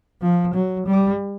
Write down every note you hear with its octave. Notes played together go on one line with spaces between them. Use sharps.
F3
F#3
G3